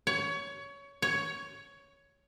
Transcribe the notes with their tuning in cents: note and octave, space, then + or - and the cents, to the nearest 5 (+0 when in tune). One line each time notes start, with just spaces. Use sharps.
C#5 +20
C#5 +10